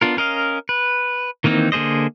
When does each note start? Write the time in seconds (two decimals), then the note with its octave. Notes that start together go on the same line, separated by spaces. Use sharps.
0.01 B3 D4 F4 A#4
0.17 C#4 A#4 D#5 F5
0.69 B4
1.44 D#3 E3 A#3 C4 D#4
1.72 D3 A#3 G#4 C5 D#5